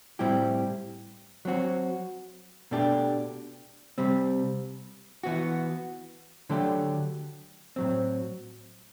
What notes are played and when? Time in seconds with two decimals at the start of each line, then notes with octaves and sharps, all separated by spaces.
0.19 A2 G3 C4 E4 G4
1.45 F#3 C4 F#4
2.71 B2 A3 D4 G4
3.98 C3 G3 C4
5.23 E3 B3 F#4
6.50 D3 F#3 A3 D4 G4
7.76 A2 F#3 C4